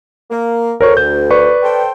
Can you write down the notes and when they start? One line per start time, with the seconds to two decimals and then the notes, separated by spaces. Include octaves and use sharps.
0.30 A#3
0.81 D2 A#4 C#5 C#6
0.97 G6
1.30 B4 D5 C#6
1.63 A4 C5 G5